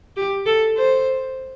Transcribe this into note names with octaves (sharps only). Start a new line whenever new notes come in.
G4
A4
C5